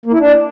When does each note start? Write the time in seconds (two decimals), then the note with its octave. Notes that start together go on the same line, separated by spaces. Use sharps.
0.06 A#3
0.13 E4
0.20 D4